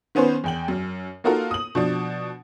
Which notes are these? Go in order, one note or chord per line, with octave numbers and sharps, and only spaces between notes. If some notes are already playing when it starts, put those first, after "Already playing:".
D#3 B3 C#4 B4 C5
E2 G5 F#7
F#2
A#3 D#4 F4 F#4 A4 A#4
D#6 F#7
B2 F3 D4